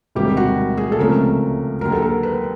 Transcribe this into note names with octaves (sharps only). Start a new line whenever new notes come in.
E1 D2 C3 D#3 G3 G4
F#4
G#4
A4
C#2 C3 F3 A3 C#4 A#4
D#2 D3 F#3 A#4
A4
A#4
B4